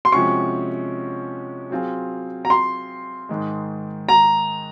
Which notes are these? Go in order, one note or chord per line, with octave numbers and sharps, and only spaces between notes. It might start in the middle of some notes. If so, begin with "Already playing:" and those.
C6
C3 F3 G#3 C#4 F#4 C#6
F#3 C4 F4 G#4
A#5
C6
G#2 D#3 G#3
A#5